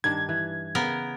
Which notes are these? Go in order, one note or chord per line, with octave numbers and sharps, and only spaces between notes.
G2 D#3 D4 G#6
E3
C#3 B3 A#4 G5